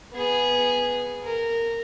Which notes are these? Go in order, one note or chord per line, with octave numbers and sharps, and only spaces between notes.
B3 G#4
A#4